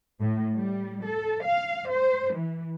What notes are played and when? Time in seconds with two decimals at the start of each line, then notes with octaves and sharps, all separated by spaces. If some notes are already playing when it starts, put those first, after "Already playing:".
0.20 A2
0.55 G3
1.06 A4
1.44 F5
1.91 C5
2.34 E3